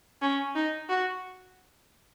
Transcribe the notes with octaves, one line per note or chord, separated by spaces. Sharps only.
C#4
D#4
F#4